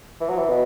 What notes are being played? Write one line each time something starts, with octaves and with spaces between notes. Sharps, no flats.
E3
F#3
E3
B2